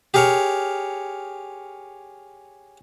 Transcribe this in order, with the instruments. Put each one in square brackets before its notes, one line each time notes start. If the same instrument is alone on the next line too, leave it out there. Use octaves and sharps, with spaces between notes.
[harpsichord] G4 G#4 A#4 C#5